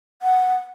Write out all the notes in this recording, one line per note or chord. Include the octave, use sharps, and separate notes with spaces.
F#5